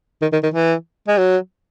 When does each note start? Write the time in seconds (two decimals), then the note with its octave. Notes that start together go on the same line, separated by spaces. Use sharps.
0.22 D#3
0.33 D#3
0.43 D#3
0.54 E3
1.08 G#3
1.18 F#3